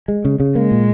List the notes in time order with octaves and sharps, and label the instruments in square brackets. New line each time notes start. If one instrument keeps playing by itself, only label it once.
[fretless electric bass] G#3
C#3
C#3
[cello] G#3 [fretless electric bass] A#3
[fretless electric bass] A#2